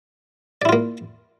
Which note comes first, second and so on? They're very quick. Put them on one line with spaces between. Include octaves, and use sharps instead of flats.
D5 E4 F4 A#3